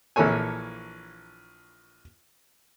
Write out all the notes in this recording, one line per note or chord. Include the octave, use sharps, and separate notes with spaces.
A#1 E3 A#3 A4 C#5 G#5